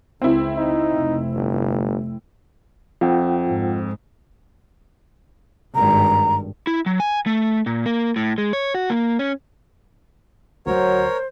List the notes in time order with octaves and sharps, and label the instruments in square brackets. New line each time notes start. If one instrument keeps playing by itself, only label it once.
[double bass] C#2 [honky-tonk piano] C4 E4
[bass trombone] D#4
[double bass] F1
[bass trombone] G1
[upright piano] F2 [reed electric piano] F4 F#5 G5
[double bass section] G#2
[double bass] G#1 G2 [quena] A#5
[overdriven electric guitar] E4
F#3
G#5
A3
A#2
A#3
A2
G#3
C#5
F#4
A#3
C#4
[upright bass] D2 [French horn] F#3 [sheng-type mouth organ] A#4 C#5 [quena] C5